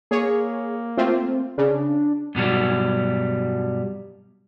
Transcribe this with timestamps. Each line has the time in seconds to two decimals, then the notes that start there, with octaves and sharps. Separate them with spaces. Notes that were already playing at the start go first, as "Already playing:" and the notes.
0.11 A#3 G#4 C#5
0.97 A3 C4 F4
1.58 C#3 D4
2.35 G2 B2 F#3 G3